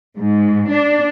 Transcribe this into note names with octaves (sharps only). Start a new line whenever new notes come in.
G#2
D4